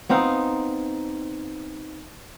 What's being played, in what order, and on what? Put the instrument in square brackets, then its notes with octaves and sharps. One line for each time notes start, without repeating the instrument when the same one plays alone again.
[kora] B3 C4 D#4 F5